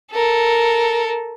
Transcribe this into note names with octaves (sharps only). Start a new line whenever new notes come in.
A4 A#4